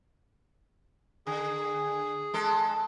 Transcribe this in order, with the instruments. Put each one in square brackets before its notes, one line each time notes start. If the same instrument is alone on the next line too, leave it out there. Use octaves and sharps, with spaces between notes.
[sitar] D3 [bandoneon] G#4
[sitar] G#3 A4